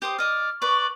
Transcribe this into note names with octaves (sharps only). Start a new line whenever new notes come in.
G4 C5 D#6
D5 D#5 F6
B4 D5 C#6 F#7